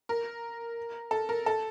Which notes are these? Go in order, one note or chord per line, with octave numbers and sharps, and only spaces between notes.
A#4
A4
A#4
A4